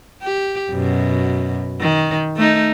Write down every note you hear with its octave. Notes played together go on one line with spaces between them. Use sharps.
G4
F#2 B2
D#3
A3 D#4